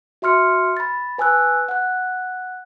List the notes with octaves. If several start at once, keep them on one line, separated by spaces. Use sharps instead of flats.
F#4 E5 C6 F6 C#7
B5 A6
B4 G#5 A5 E6 F#6
F#5 F#6